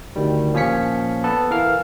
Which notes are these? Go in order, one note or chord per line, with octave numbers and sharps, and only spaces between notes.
D2 D#3 G3
A#2 F3 C#4 C#5 B6 C#7
B3 A4 B4 A5
E3 A#4 F5 F6